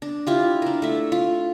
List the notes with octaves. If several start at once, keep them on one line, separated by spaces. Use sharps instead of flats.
D4
E4 F4 G4
D4 A#4
A3 E5
F4